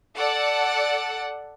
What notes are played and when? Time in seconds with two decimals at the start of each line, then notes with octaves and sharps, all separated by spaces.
0.17 A4 D5 F#5